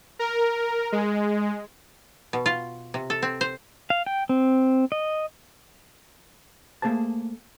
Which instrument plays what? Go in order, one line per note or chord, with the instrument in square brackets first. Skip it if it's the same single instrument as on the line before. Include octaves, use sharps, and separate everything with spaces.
[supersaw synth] A#4
G#3
[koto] B2
F4
C3
A4
C4
C5
[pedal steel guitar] F5
G5
C4
D#5
[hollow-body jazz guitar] A3 A#3 G#4 C5 A5